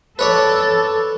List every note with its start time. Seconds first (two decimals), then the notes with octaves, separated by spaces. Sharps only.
0.19 A4 B4 C#5 D5